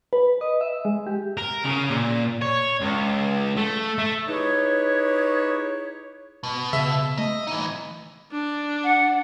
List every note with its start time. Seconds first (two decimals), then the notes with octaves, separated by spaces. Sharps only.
0.13 B4
0.41 D#5
0.61 E5
0.85 G#3
1.07 G4
1.37 A#4
1.65 C#3
1.90 A#2
2.42 C#5
2.80 C#2
3.57 A3
3.98 A3
4.27 D#4 E4 G4 G#4 B4 C#5
6.43 B2
6.73 C#3 E5
7.18 A3 D#5
7.47 E3 D#4
8.32 D4
8.84 F#5